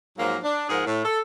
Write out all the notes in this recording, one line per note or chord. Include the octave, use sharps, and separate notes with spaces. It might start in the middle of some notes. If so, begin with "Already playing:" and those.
G#2 F3 F#3 A#3
D4
G#2 F3 G#4 A#4 F#5
A2
A4